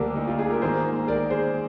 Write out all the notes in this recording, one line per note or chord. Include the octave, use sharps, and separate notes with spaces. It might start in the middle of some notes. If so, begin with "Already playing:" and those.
Already playing: D2 D3 G3 A#3 D4 G4 A#4
D#4
F4
F4 G#4
G4 A#4
G#2 D#3 A#3 G#4 C5
A#4 D5
G#4 C5